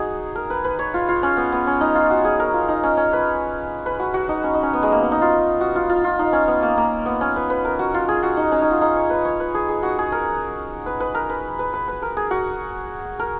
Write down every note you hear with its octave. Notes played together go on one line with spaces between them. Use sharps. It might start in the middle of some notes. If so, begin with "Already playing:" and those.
Already playing: D#4 F#4 G#4
A#4
B4
B4
C#5
F4
F4
C#4
B3
B3
C#4
D#4
F4
F#4
G#4
A#4
F4
D#4
C#4
C#4
B4
B4
F#4
F#4
D#4
C#4
D#4
C#4
B3
G#3
A#3
B3
D#4
F4
F#4
F4
F4
F4
D#4
C#4
B3
A#3
A#3
B3
C#4
B4
B4
A#4
F#4
F4
G#4
F#4
D#4
C#4
D#4
F4
D#4
C#5
B4
C#5
B4
G#4
G#4
F#4
G#4
A#4
B4
B4
A#4
B4
B4
B4
B4
A#4
G#4
F#4
A#4